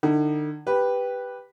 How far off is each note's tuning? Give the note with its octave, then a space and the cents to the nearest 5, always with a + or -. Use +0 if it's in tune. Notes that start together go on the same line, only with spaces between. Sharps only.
D3 +40 D#4 +40
G4 +0 B4 +0